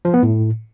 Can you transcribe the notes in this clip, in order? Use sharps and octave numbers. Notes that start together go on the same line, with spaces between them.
F3
B3
A2